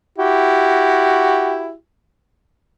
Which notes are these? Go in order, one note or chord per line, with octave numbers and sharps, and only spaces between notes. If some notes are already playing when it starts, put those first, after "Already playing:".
E4 F#4 G4